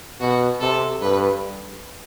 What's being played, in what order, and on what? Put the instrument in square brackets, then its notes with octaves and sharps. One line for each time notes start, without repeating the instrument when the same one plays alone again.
[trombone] B2 [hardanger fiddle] F#4
[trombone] C3 [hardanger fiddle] A4
[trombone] G2 [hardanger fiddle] B4